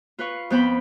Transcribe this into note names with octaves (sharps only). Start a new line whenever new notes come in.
F4 B4 F5 C#6
F2 B3 C5 G5 B5